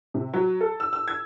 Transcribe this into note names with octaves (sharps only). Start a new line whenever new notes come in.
C3
F#3
A4
E6
E6
G#6